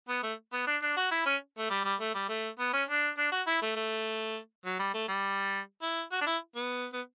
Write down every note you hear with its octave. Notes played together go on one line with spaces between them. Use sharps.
B3
A3
B3
D4
D4
F#4
E4
C#4
A3
G3
G3
A3
G3
A3
B3
C#4
D4
D4
F#4
E4
A3
A3
F#3
G3
A3
G3
E4
F#4
D4
E4
B3
B3